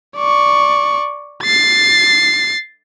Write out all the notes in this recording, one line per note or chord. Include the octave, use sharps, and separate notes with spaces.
D5 C#6
A6 C7